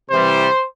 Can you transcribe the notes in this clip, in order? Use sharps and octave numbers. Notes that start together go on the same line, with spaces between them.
C3 E3 G3 C5